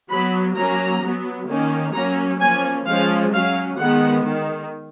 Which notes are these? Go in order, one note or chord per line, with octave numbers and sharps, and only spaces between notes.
F#3 B3 B5
F#3 A#3 C#4 A#5
F#3 B3
D#3 A#3 C#4
F#3 A#3 C#4 A#5
F3 A#3 C#4 G#5
F3 G#3 C#4 F5
F#3 C#4 F5
D#3 G#3 B3 F#5
D#3